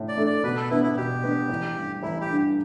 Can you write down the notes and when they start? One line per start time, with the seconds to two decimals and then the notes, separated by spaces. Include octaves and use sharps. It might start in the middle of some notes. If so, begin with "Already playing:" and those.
Already playing: A2
0.08 D5
0.17 A3 D4 A4
0.27 D5
0.44 B2 B4
0.57 A4
0.70 B3 D4 E4 B4
0.84 E4
0.96 B2 G4
1.23 B3 D4 B4
1.49 A1
1.76 G2 D3
2.02 A1 E4
2.21 G4
2.30 G2 D3